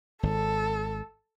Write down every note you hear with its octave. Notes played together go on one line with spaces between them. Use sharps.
G#1 A4